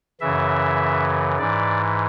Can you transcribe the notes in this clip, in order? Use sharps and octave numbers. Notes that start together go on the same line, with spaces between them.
F#2 C#3 E3 E5
G#2 E3 D5